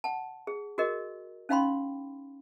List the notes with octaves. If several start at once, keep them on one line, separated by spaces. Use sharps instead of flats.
F#5 A5
G#4
F#4 G#4 A#4 D#5
C#4 D#4 F5 G5 B5 C6